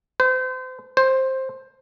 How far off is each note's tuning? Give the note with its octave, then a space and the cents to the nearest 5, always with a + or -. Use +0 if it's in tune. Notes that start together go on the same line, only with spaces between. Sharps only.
C5 -35
C5 +10